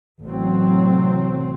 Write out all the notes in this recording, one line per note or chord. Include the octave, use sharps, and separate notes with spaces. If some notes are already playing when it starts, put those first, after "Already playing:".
A1 C3 F#3 C4